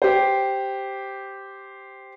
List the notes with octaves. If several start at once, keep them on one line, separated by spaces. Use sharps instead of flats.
G4 C5